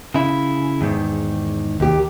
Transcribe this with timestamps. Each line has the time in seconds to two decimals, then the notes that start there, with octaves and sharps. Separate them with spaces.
0.14 C#3 E4
0.81 E2 G#2 D#3
1.80 D#2 G4